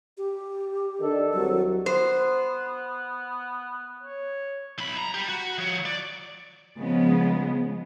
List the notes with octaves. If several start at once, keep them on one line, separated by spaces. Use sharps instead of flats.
G4
D#3 D4 A4
C2 F#3
B3 C5
C#5
B1 B5
A#5
G4 B5
F#4
F3 C#5
D5
C#3 F3 G#3 B3